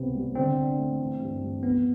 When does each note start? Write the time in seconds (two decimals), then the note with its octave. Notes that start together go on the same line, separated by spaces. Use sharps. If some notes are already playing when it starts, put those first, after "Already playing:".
Already playing: C2 C3 B3 C4
0.15 G3
0.35 D3 C4
0.57 D4
0.78 A3
0.99 E3
1.20 G2
1.42 G3
1.63 F3 B3